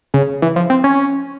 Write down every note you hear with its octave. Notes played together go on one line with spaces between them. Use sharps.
C#3
E3
F3
C4
C#4